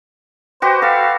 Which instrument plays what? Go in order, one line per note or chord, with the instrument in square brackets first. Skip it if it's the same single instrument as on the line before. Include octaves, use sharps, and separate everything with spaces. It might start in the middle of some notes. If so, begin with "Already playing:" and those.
[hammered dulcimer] F#4 G4 B4 [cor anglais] C5
[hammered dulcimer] A4 [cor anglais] F5